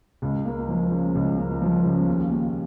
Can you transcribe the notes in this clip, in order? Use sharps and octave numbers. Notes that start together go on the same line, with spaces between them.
C#2
A#3
F3
C#3
C#2
A#3
F3
C#3
D#2
D#2